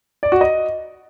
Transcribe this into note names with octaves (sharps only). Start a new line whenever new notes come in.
D5
F#4
D#5